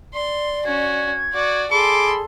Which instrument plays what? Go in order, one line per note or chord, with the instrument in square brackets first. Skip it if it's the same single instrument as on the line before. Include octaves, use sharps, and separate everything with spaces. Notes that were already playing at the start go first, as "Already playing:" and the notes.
[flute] D5 [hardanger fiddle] C6
[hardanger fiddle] C#4 F#4 [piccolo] G#6
[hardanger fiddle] F#4 D5
[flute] G#4 [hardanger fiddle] A4 C6 [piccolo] B5 [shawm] D6